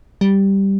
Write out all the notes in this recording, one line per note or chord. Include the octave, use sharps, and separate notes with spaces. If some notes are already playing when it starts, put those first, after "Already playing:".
G3